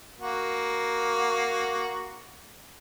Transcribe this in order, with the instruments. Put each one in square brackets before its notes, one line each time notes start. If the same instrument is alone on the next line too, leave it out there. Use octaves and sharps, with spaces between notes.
[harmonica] A#3 F#4